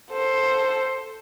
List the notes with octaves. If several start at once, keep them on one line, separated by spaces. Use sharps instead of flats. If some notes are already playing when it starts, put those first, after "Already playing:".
A4 C5